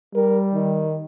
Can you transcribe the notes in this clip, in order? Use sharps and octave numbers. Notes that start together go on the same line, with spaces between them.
G3 A#4
D#3